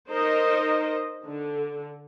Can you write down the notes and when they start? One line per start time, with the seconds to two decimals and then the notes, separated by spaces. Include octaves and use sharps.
0.10 D#4 A#4 C5 D#5
1.24 D3